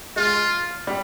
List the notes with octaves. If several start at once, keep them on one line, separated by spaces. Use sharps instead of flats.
G#3 F4
G3